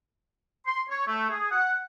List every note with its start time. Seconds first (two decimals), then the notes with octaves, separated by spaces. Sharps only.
0.66 C6
0.90 C#5
1.07 A3
1.29 G#4
1.51 F#5